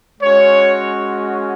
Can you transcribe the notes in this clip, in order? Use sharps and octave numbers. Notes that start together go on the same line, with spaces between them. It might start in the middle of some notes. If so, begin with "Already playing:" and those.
G#3 C#4 F#4 C#5